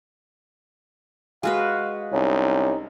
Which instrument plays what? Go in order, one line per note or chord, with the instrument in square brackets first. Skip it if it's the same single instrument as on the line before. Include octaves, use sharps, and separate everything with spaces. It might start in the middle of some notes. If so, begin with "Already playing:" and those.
[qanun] G#3 F#4 B4 [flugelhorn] F5
[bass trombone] C2 [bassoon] C#4 [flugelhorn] D#4